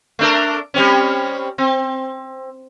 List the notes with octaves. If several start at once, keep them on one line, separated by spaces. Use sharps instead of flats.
A3 D4 A#4
G3 C4 C#4
C4